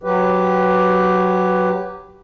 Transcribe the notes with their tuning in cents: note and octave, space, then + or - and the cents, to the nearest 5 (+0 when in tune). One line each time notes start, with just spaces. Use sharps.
F#3 +0 G4 -10 B4 +10